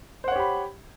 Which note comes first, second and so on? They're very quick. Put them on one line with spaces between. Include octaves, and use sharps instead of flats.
C5 F#5 C#5 G4 B5